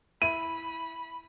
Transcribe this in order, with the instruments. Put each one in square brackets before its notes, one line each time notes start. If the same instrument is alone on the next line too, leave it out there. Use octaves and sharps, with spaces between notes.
[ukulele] E4 [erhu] B5 [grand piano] D#7